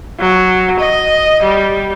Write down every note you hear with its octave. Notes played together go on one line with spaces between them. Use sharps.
F#3
D#5
G3